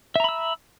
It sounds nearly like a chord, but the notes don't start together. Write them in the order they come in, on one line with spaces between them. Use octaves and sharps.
E5 A#5 B5 E6